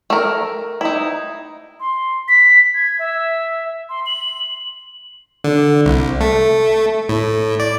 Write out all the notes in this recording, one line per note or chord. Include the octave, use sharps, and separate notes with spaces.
A3 A#4
D#4 E4
C6
B6
G#6
E5
C6
F#7
D3
C2
A3
A2
D5